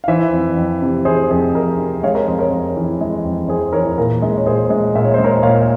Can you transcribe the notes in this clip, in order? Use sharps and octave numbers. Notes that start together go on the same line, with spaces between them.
F5
E3 C5 E5
F2
F2
C3
E3 G#4 C5
F2 G#4
F2 A#4
C3
G#3 C#5 F5
A#4 C#5
F2 G#4 C5
A#4 C#5
F2
E3
G#3
F2
F2 G#4 C5
E3 A#4 C#5
A#2 A#4
G#3
C#5
A#2 G#4 C5
G#3
A#2 E5
C#5
G#3 C5
A#4 C#5
A#2 C#5 F5